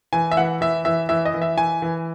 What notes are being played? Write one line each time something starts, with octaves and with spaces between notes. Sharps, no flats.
E3 G#5
E5
E3 F#5
E3 E5
E3 E5
E3 E5
D#5
E3
E5
E3 G#5
E3